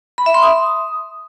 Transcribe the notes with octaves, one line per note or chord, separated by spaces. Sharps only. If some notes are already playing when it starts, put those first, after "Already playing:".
B5
E5
C6
D#6